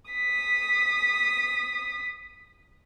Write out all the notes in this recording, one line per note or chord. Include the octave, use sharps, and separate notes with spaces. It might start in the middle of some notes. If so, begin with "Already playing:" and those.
D#6 B6